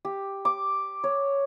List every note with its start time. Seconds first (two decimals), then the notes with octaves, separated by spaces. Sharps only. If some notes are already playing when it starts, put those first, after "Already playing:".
0.05 G4
0.45 D6
1.04 C#5